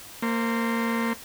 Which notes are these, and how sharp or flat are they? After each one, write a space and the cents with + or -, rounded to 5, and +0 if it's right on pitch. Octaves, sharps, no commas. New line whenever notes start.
A#3 -25 C5 +0